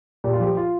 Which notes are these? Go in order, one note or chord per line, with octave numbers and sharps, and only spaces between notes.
A#2 G4
F4
F3 G4
F4